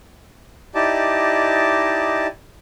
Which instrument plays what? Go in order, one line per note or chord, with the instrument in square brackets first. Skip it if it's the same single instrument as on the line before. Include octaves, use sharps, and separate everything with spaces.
[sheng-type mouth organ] D#4 E4 G4 D5 D#5 A5